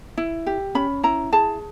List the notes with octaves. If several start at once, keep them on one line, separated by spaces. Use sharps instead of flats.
E4
G4
C#4 B5
E4 A#5
G#4 A5